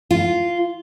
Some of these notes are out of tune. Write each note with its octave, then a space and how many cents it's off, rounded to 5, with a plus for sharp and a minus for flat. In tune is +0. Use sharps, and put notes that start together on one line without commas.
F4 -10